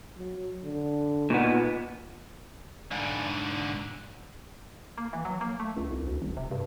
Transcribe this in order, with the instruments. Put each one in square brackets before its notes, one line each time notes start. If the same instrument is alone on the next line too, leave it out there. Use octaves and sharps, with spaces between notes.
[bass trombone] F#3
D3
[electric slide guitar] A#2 B3 [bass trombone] D#4
[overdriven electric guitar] G#2 D3
[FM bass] A#3
E3
F#3
A#3
A3
C#2
C2
D2
D#1
C3
G2